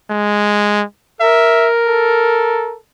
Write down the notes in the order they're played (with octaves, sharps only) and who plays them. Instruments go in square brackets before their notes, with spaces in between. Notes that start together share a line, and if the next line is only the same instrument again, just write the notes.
[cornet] G#3
[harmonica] A#4 [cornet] E5
[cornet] A4